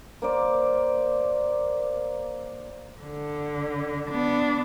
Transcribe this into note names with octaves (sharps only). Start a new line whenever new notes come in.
A#3 C5 D5
D3
B3 D4